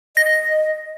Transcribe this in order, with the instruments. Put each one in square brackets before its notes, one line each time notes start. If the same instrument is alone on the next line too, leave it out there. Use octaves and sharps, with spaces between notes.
[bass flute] D#5 [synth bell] A#6